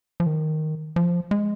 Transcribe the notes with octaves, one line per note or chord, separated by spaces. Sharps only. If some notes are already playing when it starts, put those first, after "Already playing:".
F3
D#3
F3
G#3